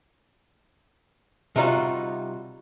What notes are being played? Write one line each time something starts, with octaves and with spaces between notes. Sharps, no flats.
C3 G3 D#4 F4 F#4